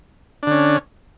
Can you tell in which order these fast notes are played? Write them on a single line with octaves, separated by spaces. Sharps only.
D4 D3 C#4